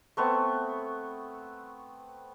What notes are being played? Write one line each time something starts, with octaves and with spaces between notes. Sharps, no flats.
A3 B3 C4 C#6